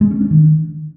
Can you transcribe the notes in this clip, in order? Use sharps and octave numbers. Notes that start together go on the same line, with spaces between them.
G#3
C#4
D4
D#3